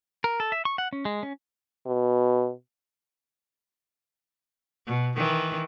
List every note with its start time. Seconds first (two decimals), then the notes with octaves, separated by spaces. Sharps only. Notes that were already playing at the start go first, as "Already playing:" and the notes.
0.24 A#4
0.40 A4
0.52 E5
0.65 C#6
0.78 F#5
0.93 C#4
1.05 G#3
1.23 C#4
1.86 B2
4.87 B2
5.16 D#3 E3